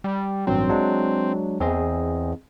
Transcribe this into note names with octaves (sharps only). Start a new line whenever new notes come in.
G3
A1 G2 F#3 C4
F#3 G#3 D4
E2 C4 G#4 D#5